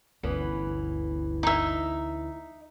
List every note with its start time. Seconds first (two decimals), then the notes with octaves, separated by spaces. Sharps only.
0.23 G1 D2 E3 B3 C#4
1.43 D#4 E5